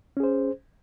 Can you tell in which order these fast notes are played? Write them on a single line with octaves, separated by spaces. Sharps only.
C#4 G#4 C5